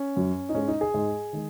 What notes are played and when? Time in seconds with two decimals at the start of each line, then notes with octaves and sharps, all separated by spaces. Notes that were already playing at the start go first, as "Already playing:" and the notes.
Already playing: C#4
0.16 F#2 F#3
0.49 D#4
0.54 G#2 G#3 C#4
0.68 D#4
0.81 G#4
0.94 G#2 G#3
1.33 D#3 G#3